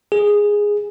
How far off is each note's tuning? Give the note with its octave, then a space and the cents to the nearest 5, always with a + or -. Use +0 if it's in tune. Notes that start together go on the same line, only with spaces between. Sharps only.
G#4 -5